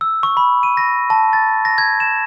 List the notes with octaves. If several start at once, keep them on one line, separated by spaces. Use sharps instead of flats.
E6
C#6
B5
D#7
A#6
A5
A6
A#6
G#6
E7